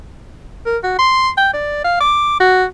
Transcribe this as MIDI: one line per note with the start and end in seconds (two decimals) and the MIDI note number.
0.66 0.77 70
0.83 0.95 66
0.99 1.29 84
1.37 1.49 79
1.53 1.80 74
1.84 1.97 77
2.00 2.37 86
2.40 2.64 66